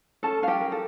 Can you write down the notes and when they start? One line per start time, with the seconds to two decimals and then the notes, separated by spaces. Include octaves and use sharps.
0.23 C#4 A4 A5
0.42 C#4 F5
0.48 G4 G5
0.61 A#4
0.72 A4